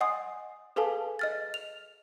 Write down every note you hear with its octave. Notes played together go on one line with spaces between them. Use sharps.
D#5 F#5 G#5 C6 D#6
G#4 A4 B4 F5 G#5 A5
D#5 F6 A6
F7